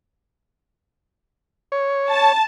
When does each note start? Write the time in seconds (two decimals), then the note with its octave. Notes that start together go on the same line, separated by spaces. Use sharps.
1.72 C#5
2.09 A5